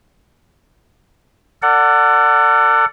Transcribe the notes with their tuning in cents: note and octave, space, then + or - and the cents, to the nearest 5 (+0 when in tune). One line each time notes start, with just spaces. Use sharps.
A4 +35 D5 -5 F#5 +0